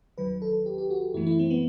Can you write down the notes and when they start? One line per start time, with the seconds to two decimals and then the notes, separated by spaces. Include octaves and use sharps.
0.18 D#2 D#3 F#3 B4
0.42 A4
0.66 G4
0.78 G4
0.90 F#4
1.14 F#2 E3 A3 E4
1.27 E4
1.39 C4
1.50 B3